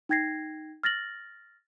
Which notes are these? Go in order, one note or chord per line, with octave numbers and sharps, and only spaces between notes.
D#4 G5 G#6 A#6 C7
F6 A6 A#6 F#7